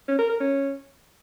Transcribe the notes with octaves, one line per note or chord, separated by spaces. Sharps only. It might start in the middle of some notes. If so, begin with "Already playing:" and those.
C#4
A#4
A#4
C#4